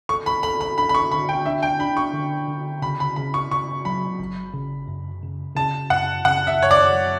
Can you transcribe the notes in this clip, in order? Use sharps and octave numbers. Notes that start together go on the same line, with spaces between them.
A4 C#6
B5
A4 B5
B5
D4 B5
B5
C#6
D3 B5
G5
D4 E5
G5
D4 B5
C#6
D3
D3
C#3 B5
B5
C#3 B5
C#6
C#3 C#6
F#3 B5
G1
C#3
F#2
C#3
C#3 A5
F#2 F#5
C#3 F#5
E5
F#2 C#5
D5
F#3